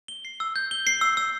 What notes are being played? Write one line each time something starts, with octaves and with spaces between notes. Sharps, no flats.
G7
C7
E6
G6
G7
C7
E6
E6